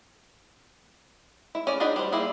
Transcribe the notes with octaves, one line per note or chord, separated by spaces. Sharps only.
E4 E5
C#4 G#4 D5
D4 D#4 F#4 G#4 B5
G3 C5
G3 A#3 E4 G#4